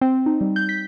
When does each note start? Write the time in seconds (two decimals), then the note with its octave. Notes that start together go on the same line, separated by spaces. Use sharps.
0.01 C4
0.26 D#4
0.41 G3
0.56 G6
0.69 B6